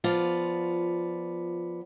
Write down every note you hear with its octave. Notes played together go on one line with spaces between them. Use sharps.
F3 B3 F4 D5